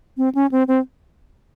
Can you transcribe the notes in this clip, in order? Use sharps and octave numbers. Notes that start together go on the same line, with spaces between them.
C4
C#4
C4
C4